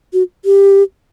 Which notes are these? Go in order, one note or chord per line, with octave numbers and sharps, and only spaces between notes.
F#4
G4